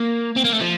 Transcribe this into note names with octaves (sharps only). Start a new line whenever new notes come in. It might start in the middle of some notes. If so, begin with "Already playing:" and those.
Already playing: A#3
C4
A#3
A3
F3